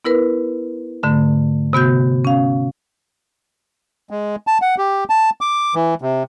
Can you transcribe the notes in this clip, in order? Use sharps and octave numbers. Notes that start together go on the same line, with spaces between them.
B3 E4 A#4 B4
G#2 D3 A3
C3 B3 F#4 G6
C#4 F5
G#3
A5
F#5
G4
A5
D6
E3
C3